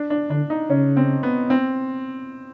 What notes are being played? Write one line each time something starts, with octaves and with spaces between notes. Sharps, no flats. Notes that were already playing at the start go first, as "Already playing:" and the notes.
Already playing: D4
D4
D3 D4
D#4
C#3 C#4
C4
B3
C4